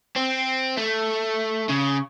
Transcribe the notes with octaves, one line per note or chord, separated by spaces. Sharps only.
C4
A3
C#3